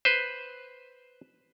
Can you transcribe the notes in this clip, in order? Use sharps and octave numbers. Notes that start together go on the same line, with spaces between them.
B4 C5